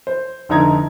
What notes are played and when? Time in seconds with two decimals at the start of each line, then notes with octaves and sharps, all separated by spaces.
0.07 C5
0.49 F1 D3 D#4 E4 A#5 G#6